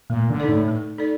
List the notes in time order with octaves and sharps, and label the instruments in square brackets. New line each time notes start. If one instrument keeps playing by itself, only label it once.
[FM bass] A#2 [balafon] A3
[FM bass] D3
[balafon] D#4 A4 D5
[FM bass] A2
[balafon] A3
D#4 A4 D5